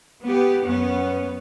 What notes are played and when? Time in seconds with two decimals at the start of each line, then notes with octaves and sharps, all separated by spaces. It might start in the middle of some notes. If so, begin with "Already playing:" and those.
0.25 B3 G4
0.64 F#2 B3 C#4